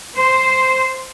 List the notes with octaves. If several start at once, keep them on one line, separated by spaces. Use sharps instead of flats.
C5